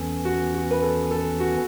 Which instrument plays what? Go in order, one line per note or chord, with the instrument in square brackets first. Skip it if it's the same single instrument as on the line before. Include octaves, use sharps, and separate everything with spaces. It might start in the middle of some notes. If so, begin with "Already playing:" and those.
Already playing: [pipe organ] E2 E3 C#4 [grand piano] A4
[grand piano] F#4
F#4
B4
A4
A4
F#4